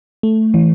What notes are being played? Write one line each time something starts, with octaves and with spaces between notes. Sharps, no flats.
A3
E3